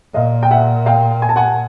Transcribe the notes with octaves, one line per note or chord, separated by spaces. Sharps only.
A#2 D#5 F5
G5
E5 F#5
F5 G5
G#5
A5
F#5 G#5